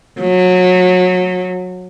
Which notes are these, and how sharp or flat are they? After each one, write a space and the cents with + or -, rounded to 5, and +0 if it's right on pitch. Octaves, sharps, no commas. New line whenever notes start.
F#3 -25